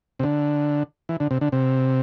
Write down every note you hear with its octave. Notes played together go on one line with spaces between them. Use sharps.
C3
D3
E3
D3
C3
D3
C3